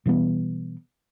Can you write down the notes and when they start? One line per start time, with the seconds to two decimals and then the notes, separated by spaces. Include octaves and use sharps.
0.06 B2 E3 G3 B3